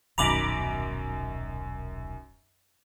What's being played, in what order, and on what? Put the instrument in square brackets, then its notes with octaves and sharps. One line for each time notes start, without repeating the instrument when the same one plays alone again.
[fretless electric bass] D#1 B1 [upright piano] F#2 D#3 F7 [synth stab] A#5 B5 D6